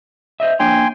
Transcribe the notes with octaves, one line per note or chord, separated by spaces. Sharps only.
C5 D#5 E5
A#3 D4 C#5 G5 G#5 C6